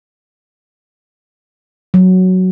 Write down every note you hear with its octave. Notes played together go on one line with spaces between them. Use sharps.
F#3